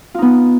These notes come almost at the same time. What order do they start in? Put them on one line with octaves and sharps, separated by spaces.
F4 D#4 B3